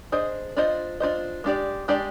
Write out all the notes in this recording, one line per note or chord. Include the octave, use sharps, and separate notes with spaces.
D4 G#4 C5 D#5
D4 F4 C5 D#5
D4 F4 C5 D#5
G#3 D4 G4 D5
G#3 D4 G4 D5